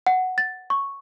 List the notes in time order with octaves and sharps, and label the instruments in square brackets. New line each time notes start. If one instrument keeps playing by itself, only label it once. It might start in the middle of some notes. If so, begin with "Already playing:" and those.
[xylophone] F#5
A6
C#6